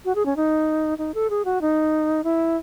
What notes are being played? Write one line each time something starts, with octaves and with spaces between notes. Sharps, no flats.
F#4
G#4
C#4
D#4
D#4
A4
G#4
F#4
D#4
E4